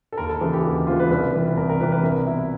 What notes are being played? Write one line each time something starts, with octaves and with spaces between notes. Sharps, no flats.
A4
D#2 A#4
A4
C#3 E3 G#4
G4
D#2 F#4
C#3 E3 F4
B4
C2 B4
C3 E3
C2 A#4
A#4
C3 E3 B4
B4
C2 A#4
B2 E4